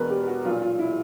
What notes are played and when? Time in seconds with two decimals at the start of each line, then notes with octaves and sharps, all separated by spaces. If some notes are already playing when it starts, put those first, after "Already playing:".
Already playing: E1 E2 B2 A#4 B4
0.10 G4
0.27 F#4
0.44 B1 A#2 F4
0.62 F4
0.79 E4